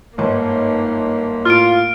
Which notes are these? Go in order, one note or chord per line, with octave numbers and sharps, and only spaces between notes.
G1 G#2 D#3 A#3
A2 F4 F6 D7